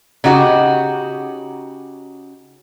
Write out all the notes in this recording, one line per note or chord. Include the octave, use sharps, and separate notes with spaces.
C#3 D#4 F#4 G4